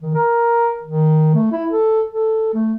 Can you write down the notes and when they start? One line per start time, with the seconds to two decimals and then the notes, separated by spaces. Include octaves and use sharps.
0.02 D#3
0.14 A#4
0.83 D#3
1.34 A3
1.52 E4
1.71 A4
2.10 A4
2.54 A3